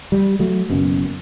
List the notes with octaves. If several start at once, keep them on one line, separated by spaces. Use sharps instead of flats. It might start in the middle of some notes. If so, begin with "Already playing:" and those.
G3
F#3 A3
F#1 F#2 B2